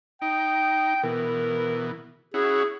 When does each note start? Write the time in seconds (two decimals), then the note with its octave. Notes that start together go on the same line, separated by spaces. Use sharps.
0.22 D#4 G5
1.03 B2 E3 A#4
2.34 C#4 E4 F#4 G#4